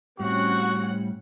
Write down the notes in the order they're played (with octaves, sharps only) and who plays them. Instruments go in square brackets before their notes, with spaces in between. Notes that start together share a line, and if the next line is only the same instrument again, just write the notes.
[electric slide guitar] A2 G3 [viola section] C4 C#4 F#5 [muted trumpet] F#4